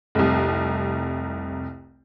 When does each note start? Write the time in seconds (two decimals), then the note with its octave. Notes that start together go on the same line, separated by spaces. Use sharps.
0.15 F1 C2